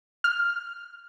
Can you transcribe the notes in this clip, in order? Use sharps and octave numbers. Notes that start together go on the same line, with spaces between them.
F6